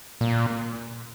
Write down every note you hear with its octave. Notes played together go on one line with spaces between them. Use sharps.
A#2